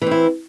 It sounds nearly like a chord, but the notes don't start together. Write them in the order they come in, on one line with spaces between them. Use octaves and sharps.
E3 C4 E4